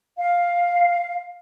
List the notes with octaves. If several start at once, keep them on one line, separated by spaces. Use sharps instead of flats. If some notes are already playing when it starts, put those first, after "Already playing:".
F5